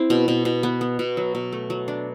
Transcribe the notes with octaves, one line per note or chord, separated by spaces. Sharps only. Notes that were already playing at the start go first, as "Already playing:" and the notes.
Already playing: C4 E4
B2
B2
B2
B3
B3
B2
F#3
B2
A3
F#3
D4